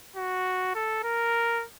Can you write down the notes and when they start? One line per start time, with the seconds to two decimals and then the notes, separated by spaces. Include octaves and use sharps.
0.16 F#4
0.75 A4
1.04 A#4